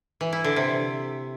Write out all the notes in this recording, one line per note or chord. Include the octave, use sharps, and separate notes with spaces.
E3
E4
D3
C3